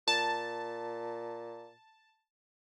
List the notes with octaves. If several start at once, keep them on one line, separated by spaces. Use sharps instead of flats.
A#2 A5